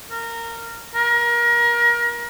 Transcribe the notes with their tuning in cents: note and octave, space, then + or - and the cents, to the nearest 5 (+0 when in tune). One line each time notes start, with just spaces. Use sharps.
A#4 -15
A#4 +30